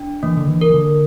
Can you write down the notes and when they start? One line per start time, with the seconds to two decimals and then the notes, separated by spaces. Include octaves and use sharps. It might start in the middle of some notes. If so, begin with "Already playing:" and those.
Already playing: D4
0.23 E3 A#3
0.37 D3
0.48 E3
0.61 A#4
0.70 E3
0.74 D3